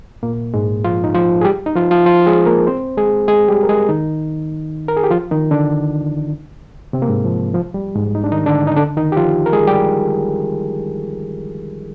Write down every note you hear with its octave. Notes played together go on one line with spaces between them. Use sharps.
A#2 A#3
G#2 G#3
F3 F4
D#4
F3 F4
G#4
G3 G4
D#4
F3 F4
F3 F4
F3 F4
G#3 G#4
A#3 A#4
C4 C5
G#3 G#4
G#3 G#4
G3 G4
A#4
G#3 G#4
D#3 D#4
A#4
G#4
G4
F3 F4
D#3 D#4
D3 D4
C3 C4
A#3
G#2 G#3
F3
F3
G3
G#2 G#3
D#4
D4
D#3 D#4
D3 D4
D#4
D3 D4
D#3 D#4
G4
F3 F4
A#4
G#3 G#4
G3 G4